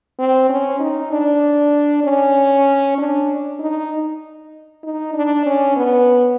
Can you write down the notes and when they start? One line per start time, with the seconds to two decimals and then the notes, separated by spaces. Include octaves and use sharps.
0.19 C4
0.50 C#4
0.80 D#4
1.11 D4
2.04 C#4
2.98 D4
3.60 D#4
4.84 D#4
5.14 D4
5.46 C#4
5.77 B3